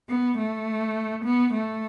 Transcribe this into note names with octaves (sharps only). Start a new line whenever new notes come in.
B3
A3
B3
A3